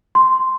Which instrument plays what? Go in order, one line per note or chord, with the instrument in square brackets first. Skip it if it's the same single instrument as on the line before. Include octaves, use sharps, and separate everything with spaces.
[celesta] C6